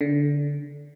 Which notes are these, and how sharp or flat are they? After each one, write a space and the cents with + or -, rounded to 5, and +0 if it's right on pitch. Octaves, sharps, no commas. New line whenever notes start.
D3 -20